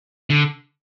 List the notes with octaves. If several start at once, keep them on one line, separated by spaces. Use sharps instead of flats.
D3